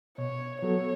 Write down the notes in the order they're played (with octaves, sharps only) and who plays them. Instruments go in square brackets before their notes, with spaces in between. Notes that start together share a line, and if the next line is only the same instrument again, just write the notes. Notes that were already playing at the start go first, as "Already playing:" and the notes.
[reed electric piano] B2 [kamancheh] C#5
[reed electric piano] F#3 B3 F#4 A4 [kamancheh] C#5